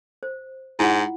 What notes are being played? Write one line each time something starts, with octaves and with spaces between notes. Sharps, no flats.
C5
G#2 E4 F4 F#5